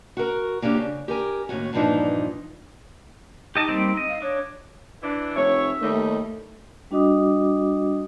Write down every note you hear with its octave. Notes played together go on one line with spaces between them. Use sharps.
F#4 A#4
A#3 C#4 D4 G4
C#3
G4 A#4 G#5
D#2 A2 C#4 F#4
G2 A#2 E3 F3 D4 D#4
D#4 G4 D#5 A5
G3 A#3 C4
D#5
F5
D4 C#5
E3 D4
F1 C#5 E5
D#2 G3 A3 D#4
G3 D4 F#4 D#5 D6 D#6